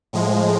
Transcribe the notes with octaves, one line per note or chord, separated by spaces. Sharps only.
A2 F3 G#3